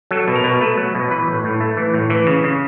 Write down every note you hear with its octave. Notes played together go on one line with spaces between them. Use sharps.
F#3 A4
B2
A#4
B2
A3 B4
F#3
B2
E3 B4
A2
A2
A3
E3
A2
E3
C#3
C#3